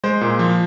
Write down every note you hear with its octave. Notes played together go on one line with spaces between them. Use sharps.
G#3 C5
A#2
F3